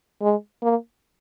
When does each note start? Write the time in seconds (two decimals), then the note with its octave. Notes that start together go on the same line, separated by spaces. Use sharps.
0.22 G#3
0.62 A#3